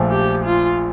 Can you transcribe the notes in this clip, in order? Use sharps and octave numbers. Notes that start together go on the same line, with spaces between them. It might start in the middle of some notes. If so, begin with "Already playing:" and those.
Already playing: A#1 A#2 F3 A3
G4
F4